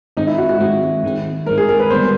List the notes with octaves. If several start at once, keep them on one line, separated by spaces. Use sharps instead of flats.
G#2 D#3 G#3 C4 D#4
E4
F#4
F#4
G#2 D#3 G#3 C4
G#2 D#3 G#3 C4
G#2 D#3 G#3 C4 A#4
G#4
A#4
B4
D3 G3 B3 C5